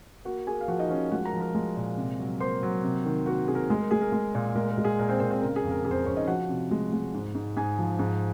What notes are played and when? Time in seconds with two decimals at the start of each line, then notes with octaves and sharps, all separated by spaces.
0.25 A#3 F#4 F#5
0.47 A#3 G#4 G#5
0.61 F5
0.68 F3 F#4 F#5
0.79 D#4 D#5
0.90 F3 C#4 C#5
1.11 G#3 F#4 F#5
1.25 A#4 A#5
1.33 F3
1.41 A#4 A#5
1.55 G#3
1.77 A#2
1.97 C3
2.19 F#3
2.40 A#3 C5 C6
2.63 F#3
2.83 C3
3.05 D#3
3.26 A#3 F#4 F#5
3.48 C3 G#4
3.55 A#4
3.70 G#3 G#4
3.80 A#4
3.91 G#3 G#4
4.01 A#4
4.12 G#3
4.35 A#2
4.56 G#3 A#4
4.70 A#4
4.78 G#3
4.85 G#4
4.99 A#2 A#4
5.09 C4 C5
5.20 A#2 C4 C5
5.31 C4 C5
5.41 C#3 A#4
5.56 G#4
5.64 F2
5.71 A#4
5.84 F2 G#4
5.91 C5
5.95 A#4
6.06 F2 C#4 C#5
6.17 D#4 D#5
6.28 F3 F#4 F#5
6.49 C3
6.71 G#3
6.93 G#3
7.14 G#2
7.35 G#2
7.56 G#2 G#4 G#5
7.78 F3
7.99 G#2